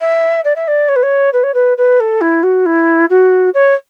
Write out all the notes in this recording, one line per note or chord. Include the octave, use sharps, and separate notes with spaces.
E5
D5
E5
D5
C#5
B4
C#5
B4
C#5
B4
B4
A4
E4
F#4
E4
F#4
C#5